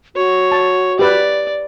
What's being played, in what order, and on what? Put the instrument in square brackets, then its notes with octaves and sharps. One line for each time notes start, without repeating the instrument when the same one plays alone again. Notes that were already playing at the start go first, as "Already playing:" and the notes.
[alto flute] F#4 [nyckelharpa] C#5
[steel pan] A5
[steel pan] G4 B4 [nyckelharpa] D5